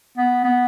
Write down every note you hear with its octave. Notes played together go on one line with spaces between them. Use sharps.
B3
B3